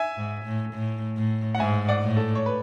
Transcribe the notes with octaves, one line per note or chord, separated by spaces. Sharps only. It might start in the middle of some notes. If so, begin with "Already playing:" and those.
Already playing: E5 G#5
G#2
A2
A2
A2
F#5
G#2 E5 G#5
D5 F#5
A2
A4
C#5
B4